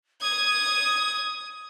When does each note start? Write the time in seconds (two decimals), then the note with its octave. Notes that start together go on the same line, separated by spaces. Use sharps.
0.22 D#6 G#6